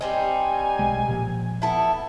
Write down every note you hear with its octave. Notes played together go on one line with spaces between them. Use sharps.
G3 C4 D#4 G#5
B1 G#3
A#2 F3
B3 E4 A4